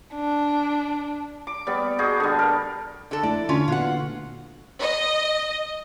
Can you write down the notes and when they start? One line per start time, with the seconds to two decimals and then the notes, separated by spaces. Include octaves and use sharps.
0.15 D4
1.47 D6
1.67 G3 B3 D5
1.99 D#4 F#4 G#4 D#5
2.20 D3 G3
2.39 A#4
3.11 D3 A4
3.23 A3 E4 A4 D5
3.49 D3 C#4 D4 F4
3.68 A#2 B3 F4 F#4 F#5
4.83 D#5